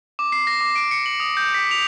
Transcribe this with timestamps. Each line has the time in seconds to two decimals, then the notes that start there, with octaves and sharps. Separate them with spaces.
0.19 D6
0.32 C7
0.47 A#6
0.61 D6
0.76 D7
0.91 C#7
1.06 F#7
1.20 D#6
1.37 G6
1.54 B6
1.71 F7